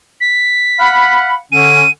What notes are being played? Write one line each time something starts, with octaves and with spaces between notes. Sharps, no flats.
B6
F5 F#5 B5
D3 C#4 D#7